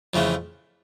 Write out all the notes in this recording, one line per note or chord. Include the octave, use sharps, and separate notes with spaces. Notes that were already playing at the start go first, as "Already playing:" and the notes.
F2 C#3 E3 A3